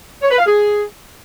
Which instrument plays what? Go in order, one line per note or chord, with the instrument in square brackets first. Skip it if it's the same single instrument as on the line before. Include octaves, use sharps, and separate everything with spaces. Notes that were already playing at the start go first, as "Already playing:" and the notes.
[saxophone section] C#5
B4
F5
G#4